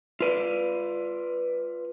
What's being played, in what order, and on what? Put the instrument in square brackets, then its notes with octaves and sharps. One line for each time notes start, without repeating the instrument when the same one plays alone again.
[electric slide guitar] F4 B4 D5